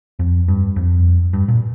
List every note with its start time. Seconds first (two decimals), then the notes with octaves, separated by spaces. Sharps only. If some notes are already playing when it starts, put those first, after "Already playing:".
0.19 F2
0.48 G2
0.76 F2
1.33 G2
1.48 A#2